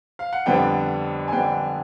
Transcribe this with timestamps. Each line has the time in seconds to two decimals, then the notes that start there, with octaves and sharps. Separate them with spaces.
0.19 F5
0.33 F#5
0.46 F2 D3 G3 B3 D4 G5
1.28 G#5
1.33 F2 D3 G3 B3 D4 G5